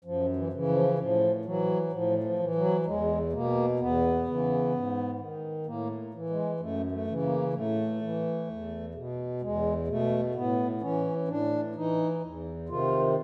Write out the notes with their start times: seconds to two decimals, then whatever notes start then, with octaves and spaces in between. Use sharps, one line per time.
0.04 F#2 F3
0.36 E3
0.52 C#3 E3
0.68 F3
0.99 A2 F3
1.45 E3 F#3
1.93 A2 F3
2.24 F3
2.39 E3
2.55 F#3
2.86 E2 G#3
3.33 B2 A#3
3.79 E2 B3
4.27 C#3 E3
4.73 G#2
5.19 D#3
5.66 A2 A#3
6.14 E3
6.30 G#3
6.60 F#2 A3
6.92 A3
7.07 C#3 E3
7.22 A#3
7.53 A2 A3
8.01 E3
8.48 E2
8.95 B2
9.41 E2 G#3
9.88 B2 A3
10.34 A2 B3
10.81 E3 C#4
11.28 A2 D4
11.75 E3 D#4
12.23 E2
12.69 C3 D#3 F4